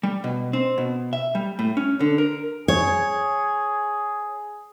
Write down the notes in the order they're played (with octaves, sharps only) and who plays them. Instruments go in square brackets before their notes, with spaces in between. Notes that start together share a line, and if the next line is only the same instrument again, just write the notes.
[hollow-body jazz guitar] G3
B2
C4
B2
E5
G3
A2
C#4
D3
A#4
[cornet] G#4 [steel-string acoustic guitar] C#5